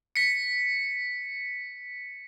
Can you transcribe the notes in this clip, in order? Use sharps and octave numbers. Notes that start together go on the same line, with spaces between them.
B6 C#7